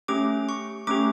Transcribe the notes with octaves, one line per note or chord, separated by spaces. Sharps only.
A3 C#4 G4 D6
C#6
A3 C#4 G4 D6